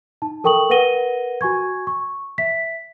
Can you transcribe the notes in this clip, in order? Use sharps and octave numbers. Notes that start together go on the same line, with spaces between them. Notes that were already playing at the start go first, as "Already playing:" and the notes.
D#4 A5
A4 A#4 G5 C#6 D#6 F#7
A#4 B4 F#5 A#6 D#7 G7
F#4 G#5 C#6 G#6
C#6
E5 B6